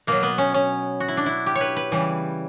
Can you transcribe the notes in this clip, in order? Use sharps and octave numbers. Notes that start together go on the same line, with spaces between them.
B2 F#3 A#3
B3
C#4
C#4
F#4
E4
D4
E4
G4
C#5
B4
B4
C#3 E3 G3